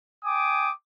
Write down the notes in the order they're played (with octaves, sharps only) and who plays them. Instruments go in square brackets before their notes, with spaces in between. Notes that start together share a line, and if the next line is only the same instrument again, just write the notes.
[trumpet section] G5 G#5 D6 D#6